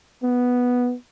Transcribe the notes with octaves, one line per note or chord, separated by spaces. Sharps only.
B3